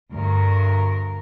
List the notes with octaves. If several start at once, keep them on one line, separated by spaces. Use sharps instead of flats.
D2 G2 A#4